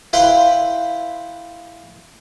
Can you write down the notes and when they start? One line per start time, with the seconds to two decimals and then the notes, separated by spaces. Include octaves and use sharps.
0.13 E4 B4 F5 G5 B5 C6